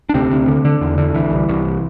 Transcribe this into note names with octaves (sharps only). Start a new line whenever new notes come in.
D4
D2 C3 C4
D2
D3
D3
E2
D3
C2 E3
C2
C2